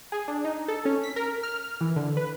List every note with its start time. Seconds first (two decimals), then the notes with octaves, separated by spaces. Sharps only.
0.12 G#4
0.28 D4
0.45 D#4
0.68 A4
0.85 C#4
1.04 B6
1.16 A#4
1.43 F6
1.81 E3
1.96 D3
2.17 B4